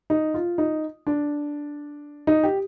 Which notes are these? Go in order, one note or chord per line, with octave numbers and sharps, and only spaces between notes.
D#4
F4
D#4
D4
D#4
G4